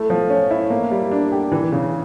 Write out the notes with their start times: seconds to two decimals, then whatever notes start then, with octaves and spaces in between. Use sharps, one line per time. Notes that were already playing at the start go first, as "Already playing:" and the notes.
Already playing: A3 E4
0.10 F3
0.30 C#4
0.51 E4
0.70 A#3
0.91 G3
1.12 D4
1.32 G4
1.52 E3
1.72 C#3